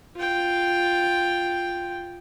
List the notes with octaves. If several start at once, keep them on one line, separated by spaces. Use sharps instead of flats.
F4 G5